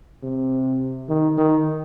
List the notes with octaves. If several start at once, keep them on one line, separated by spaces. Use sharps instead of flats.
C3
D#3
D#3